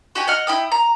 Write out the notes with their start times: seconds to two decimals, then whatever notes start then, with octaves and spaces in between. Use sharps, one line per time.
0.15 F#4 G4 G#5
0.27 D#5 F#5 F6
0.47 E4 G5 D#6
0.72 A#5